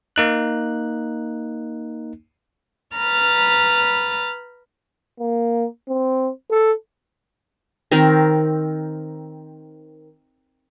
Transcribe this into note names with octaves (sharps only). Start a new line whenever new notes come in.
A#3 D#4 F#6
B4 A#5 B5 F6 A6
A#3
C4
A4
D#3 C4 A#4